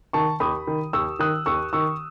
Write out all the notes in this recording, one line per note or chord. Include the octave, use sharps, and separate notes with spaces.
D#3 A5 C#6
D#2 B5 D#6
D#3
D#2 C#6 E6
D#3 D#6 F#6
D#2 C#6 E6
D#3 C#6 E6